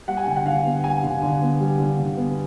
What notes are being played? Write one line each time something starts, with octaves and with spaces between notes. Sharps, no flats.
G3 F#5
G#5
D3 G5
F#5
D3 F5
B3
G3 G#5
D3
D3
B3
G3
D3
D3
B3